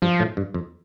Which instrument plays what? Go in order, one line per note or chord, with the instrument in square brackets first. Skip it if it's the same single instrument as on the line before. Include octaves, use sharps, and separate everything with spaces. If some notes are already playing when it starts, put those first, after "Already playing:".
[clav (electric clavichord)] G2 [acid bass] F3
[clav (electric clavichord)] A2
G2
F2